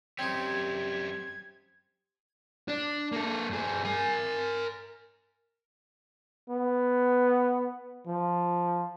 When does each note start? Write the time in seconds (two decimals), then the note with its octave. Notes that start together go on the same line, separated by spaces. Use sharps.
0.19 F#2 G3 C4 D#4 G4 G#6
2.68 D4
3.12 A#3 A4
3.50 G2 G#4
3.85 A#4 G#5
6.50 B3
8.07 F3